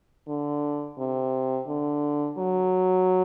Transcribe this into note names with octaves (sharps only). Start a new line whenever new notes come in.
D3
C3
D3
F#3